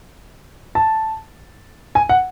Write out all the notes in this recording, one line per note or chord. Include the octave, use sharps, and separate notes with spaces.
A5
G#5
F#5